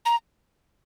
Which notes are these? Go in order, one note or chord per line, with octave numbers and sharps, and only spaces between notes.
A#5